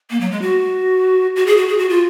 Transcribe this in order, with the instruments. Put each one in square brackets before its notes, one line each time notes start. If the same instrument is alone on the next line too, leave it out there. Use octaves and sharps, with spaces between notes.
[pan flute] A#3
F#3
G#3
F#4
F#4
G#4
F#4
G#4
F#4
F4